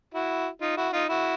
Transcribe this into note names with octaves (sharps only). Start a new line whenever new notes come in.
E4 F#4
D#4 F4
E4 F#4
D#4 F4
E4 F#4